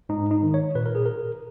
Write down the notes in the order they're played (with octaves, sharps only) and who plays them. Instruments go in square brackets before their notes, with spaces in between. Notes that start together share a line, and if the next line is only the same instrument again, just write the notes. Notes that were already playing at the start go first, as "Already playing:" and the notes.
[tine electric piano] G#2 D#4
D#4
D#3
C#5
A#2 B4
A#4
G#4
A#4